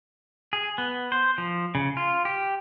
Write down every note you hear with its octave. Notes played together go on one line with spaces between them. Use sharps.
G#4
B3
C5
F3
C#3
F4
G4